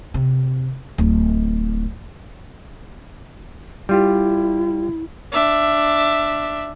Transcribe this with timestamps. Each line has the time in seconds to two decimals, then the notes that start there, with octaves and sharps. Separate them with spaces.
0.14 C3
0.98 D1
3.89 G3 E4 F4 G4
5.32 D4 E5